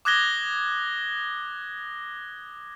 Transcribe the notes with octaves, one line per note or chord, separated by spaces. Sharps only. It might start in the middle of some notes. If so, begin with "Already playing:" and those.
D6 D#6 F#6 G#6 A#6 G7